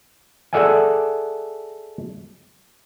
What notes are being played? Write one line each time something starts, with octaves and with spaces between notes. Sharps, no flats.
G#4 A4 D5 E5 F#5 G#5